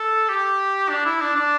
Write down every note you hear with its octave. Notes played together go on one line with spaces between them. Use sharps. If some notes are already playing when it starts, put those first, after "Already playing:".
Already playing: A4
G4
D4
E4
D4
D4